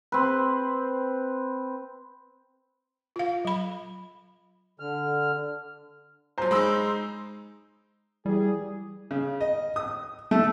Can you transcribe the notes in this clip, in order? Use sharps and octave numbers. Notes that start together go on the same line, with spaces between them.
C4 B4
F4 F5
F#3 B5
D3 F6
A#2 F#3 C5 A#5
G#3 D#4 B5 C6 E6
E3 G3 G4 G#4
C#3
D#5
D#6
A3